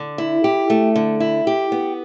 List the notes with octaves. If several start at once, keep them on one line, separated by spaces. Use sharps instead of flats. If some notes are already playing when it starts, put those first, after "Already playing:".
Already playing: D3
E4
G4
A3
D3
E4
G4
B3